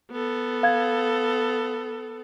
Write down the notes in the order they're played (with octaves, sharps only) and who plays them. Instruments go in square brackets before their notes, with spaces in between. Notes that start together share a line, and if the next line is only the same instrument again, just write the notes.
[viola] B3 A4
[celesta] F5 G#6